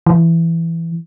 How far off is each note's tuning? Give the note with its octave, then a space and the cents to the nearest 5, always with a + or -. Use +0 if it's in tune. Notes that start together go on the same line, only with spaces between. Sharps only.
E3 +10